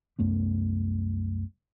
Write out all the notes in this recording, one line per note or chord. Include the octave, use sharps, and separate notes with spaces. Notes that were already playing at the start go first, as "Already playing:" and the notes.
C2 F#2 A3 B3